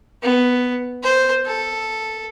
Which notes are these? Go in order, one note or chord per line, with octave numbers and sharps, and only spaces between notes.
B3
C5
A4